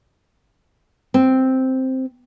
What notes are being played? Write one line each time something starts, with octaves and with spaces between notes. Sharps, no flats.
C4